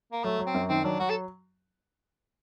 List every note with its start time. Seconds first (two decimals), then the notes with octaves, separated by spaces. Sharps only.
0.12 A#3
0.24 F#3 A3
0.39 F#3
0.46 C4
0.54 F#2
0.69 D#3 C4
0.84 F#3 D4
1.00 F#3 F#4
1.09 A4